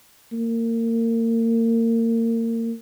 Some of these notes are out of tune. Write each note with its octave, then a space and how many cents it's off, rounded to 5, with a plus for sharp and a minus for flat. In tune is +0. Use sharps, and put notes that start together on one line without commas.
A#3 -30